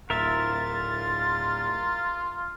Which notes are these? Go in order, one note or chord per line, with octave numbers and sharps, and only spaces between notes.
D1 F4 A#4 E5 A6